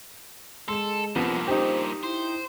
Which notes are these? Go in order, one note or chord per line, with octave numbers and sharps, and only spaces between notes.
G#3 A4 C6 E7
C2 G2 A#2 F3 B3
D#4 G4 C5
E4 C5